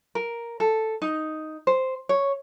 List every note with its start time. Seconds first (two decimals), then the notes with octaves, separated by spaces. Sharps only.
0.15 A#4
0.60 A4
1.02 D#4
1.67 C5
2.09 C#5